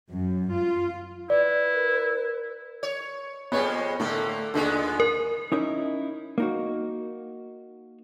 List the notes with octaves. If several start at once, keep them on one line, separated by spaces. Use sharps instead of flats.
F#2
F4
E4 B4 D5
A#4
C#5
F2 G3 G#3 B3 C#5
A2 D3 A3 A#3
D#2 A#2 D3 G#3 B3
A#4
C#4 D#4 E4 A#4
A#3 D#4 F#4